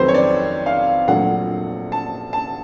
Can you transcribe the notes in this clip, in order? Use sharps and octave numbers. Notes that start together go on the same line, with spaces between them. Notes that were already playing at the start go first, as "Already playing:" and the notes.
Already playing: F2 C3 D#3 F#3 A3 B4 C5
C#5
D5
F5
A#1 A#2 F#3 A3 F#5
A5
A5